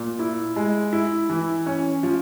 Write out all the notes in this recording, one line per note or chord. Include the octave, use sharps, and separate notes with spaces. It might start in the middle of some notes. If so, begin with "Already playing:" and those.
Already playing: A#2
E4
G#3
E4
E3
C#4
F3